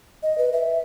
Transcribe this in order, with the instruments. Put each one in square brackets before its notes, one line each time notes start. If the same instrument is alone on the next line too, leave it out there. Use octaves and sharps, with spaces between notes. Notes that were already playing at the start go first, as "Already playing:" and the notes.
[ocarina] D#5
B4
E5